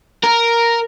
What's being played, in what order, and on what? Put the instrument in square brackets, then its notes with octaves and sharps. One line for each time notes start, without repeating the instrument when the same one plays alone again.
[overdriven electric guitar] A#4